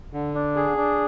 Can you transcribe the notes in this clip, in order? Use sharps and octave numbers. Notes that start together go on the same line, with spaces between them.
D3
D4
G#4
D4